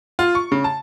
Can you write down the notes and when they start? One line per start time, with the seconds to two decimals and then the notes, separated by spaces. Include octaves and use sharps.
0.19 F4
0.35 C#6
0.52 C#3
0.64 A5